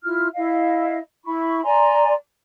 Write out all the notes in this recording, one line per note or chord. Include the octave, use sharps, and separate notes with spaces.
E4 F4 F6
E4 D#5 F5
E4 B5 C#6
D5 G#5 A#5 C6